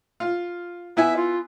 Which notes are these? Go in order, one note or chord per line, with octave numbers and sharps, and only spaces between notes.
F4
B3 E4 E5 G#5
F4